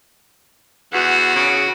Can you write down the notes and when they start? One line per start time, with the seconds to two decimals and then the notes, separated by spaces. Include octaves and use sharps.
0.93 E2 F#4
1.35 C#3